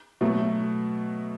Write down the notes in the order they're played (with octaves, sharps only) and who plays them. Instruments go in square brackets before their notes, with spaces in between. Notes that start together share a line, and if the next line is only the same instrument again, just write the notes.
[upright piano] B2 F#3 A3